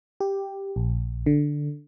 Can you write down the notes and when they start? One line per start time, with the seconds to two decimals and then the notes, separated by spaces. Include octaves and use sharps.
0.20 G4
0.76 A#1
1.26 D3